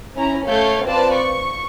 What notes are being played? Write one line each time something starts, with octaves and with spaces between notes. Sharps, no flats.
C#4 E4 A#5
A3 C#5 F5 G6
C4 F4 B4 C5 D5 A5
C#6